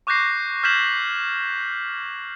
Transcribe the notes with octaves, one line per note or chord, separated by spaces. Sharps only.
C#6 D6 F#6 G6 A#6 C7
F6 G6 G#6 B6 E7 F#7